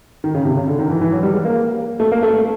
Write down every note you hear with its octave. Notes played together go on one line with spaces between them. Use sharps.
D#3
C#3
C3
C#3
D3
D#3
E3
E3
F#3
G3
G#3
A#3
A3
A#3
A3
A3